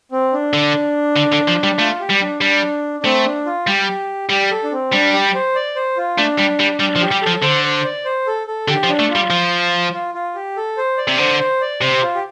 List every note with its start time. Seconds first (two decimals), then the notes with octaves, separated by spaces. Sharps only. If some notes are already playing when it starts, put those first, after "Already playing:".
0.12 C4
0.33 D4
0.53 D3
1.16 D3
1.32 D3
1.48 F3
1.63 G3
1.79 A3 F4
2.00 G4
2.10 G3
2.21 D4
2.41 G3 D4
3.00 D4
3.04 A3 C4
3.25 D4
3.46 F4
3.67 G3 G4
4.30 G3 G4
4.51 A4
4.64 D4
4.72 C4
4.92 G3 D4
5.13 G4
5.34 C5
5.55 D5
5.76 C5
5.97 F4
6.17 A3 D4
6.38 G3
6.59 G3
6.80 G3 D4
6.96 F3
7.01 G4
7.12 G3
7.22 F3 A4
7.42 D3 C5
7.64 C5
7.84 D5
8.05 C5
8.27 A4
8.47 A4
8.68 D3 G4
8.84 F3
8.89 D4
8.99 A3
9.10 F4
9.15 G3
9.30 F3
9.93 F4
10.14 F4
10.35 G4
10.57 A4
10.77 C5
10.98 D5
11.08 C3
11.19 D3 C5
11.39 C5
11.61 D5
11.81 C3 C5
12.02 F4
12.15 G4